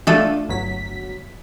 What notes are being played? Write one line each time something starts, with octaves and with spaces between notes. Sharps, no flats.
A3 D4 F4 A4
G1 F#3 B6